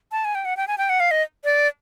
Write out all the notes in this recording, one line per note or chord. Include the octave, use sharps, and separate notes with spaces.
A5
G#5
G5
F#5
G5
G#5
G5
F#5
F5
D#5
D5